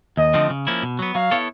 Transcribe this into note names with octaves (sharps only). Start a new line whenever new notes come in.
D#2 D#5
D3 F3 A3 C4
C#3
F3 A#3 C#4 E4
B2
F#3 B3
F#3 F5
B3 E4 A4 C#5